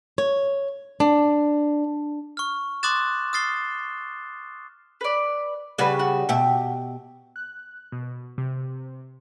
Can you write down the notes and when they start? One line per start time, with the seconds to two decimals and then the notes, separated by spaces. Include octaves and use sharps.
0.18 C#5
1.00 D4
2.37 C#6 F6
2.83 C6 D6 D#6 F#6 A6 E7
3.33 D#6 F6 A6 C7 G7
5.01 B4 D5
5.78 C#3 G3 F#4 B4
5.99 F#4
6.29 B2 G4 E5
7.36 F#6
7.92 B2
8.38 C3